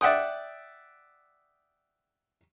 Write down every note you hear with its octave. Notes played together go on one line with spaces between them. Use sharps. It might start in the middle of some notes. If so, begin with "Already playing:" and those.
D5 E5 F#5 G5 D#6